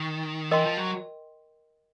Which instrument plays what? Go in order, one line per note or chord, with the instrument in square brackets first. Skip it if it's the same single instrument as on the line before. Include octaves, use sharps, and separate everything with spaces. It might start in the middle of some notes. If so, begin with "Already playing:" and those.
Already playing: [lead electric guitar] D#3
[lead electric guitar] E3 [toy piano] A#4 D#5 G5 C6
[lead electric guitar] F3
F#3